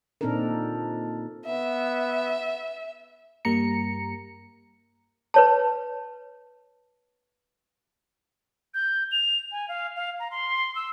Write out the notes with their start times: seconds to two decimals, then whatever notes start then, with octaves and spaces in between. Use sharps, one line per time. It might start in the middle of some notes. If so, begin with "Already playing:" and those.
0.21 A#2 C4 D4 D#4 A4 A#4
1.46 B3 E5
3.45 G2 G3 A#3 A#5 C#7
5.34 B4 C#5 A5
8.74 G6
9.12 F7
9.52 G#5
9.68 F5
9.96 F5
10.20 A#5
10.31 C6
10.75 E6